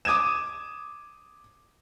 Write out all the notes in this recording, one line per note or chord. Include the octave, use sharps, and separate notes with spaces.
D6 D#6 G#6 D#7 E7